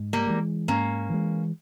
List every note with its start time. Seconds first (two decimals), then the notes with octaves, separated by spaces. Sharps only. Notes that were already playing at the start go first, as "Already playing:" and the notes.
Already playing: G#2
0.13 G3 A#3
0.27 E3 G#3
0.68 G#2 A#3 C#4
1.10 E3 G#3